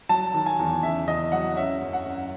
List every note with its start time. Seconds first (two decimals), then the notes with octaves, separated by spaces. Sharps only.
0.09 F#3 A5
0.34 D#3
0.46 G#5
0.59 E2
0.83 C#3 E5
1.07 E2 D#5
1.32 F#3 F#5
1.57 C#4 E5
1.81 F#2
1.93 F#5
2.06 C#4